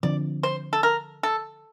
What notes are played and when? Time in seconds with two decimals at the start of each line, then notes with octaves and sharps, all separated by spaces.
0.03 D3 F3 C4 D5
0.43 C5
0.73 A4
0.83 A#4
1.23 A4